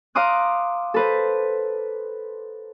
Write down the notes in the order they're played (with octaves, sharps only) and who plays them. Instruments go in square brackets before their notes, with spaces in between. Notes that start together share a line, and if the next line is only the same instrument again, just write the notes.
[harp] F5 A#5 C6 D6 D#6 F#6
A4 B4 C5